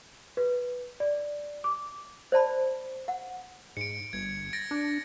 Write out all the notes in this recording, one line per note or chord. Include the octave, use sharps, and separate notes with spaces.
B4
D5
D6
C5 D5 A5 B5
F#5
G#2 C#7 D7
G1 G#6
A6 A#6 D7
D4